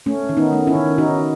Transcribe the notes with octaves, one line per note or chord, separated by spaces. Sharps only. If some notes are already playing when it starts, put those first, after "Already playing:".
A3 C#4
D#3
B3 D#4
A3
C#4 E4
D#3
D#3 D#4 F#4